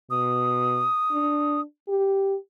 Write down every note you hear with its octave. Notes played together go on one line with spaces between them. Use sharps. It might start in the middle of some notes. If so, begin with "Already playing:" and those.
B2 D#6
D4
G4